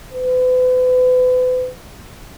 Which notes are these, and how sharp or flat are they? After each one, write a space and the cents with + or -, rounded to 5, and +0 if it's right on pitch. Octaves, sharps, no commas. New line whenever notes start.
B4 +40